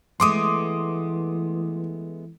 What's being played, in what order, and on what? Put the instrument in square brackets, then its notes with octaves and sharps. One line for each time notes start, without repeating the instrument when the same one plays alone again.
[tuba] E3 [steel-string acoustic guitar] G#3 A3 B3 [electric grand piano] C6 D6 D#6